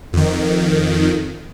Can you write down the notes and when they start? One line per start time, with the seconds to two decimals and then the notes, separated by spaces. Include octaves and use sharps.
0.13 F2 D#3